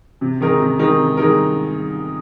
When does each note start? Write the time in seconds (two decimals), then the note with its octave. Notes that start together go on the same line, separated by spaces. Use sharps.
0.21 C3
0.41 D#3 G#3 D#4 A#4
0.60 C3
0.79 D#3 G#3 D#4 A#4
0.98 C3
1.17 D#3 G#3 D#4 A#4